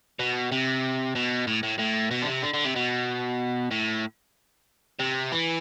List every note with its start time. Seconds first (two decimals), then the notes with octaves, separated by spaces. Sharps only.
0.19 B2
0.52 C3
1.15 B2
1.47 A2
1.63 A2
1.79 A2
2.11 B2
2.22 D3
2.27 C3
2.43 D3
2.54 D3
2.64 C3
2.76 B2
3.71 A2
4.99 C3
5.32 E3